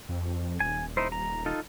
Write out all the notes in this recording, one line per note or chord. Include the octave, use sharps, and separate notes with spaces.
F2
D#1 G#5
D#4 E4 C5
A#5
D#4 F4 A4